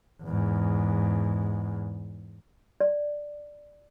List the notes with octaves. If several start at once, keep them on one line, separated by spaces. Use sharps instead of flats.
E2 G#2
D5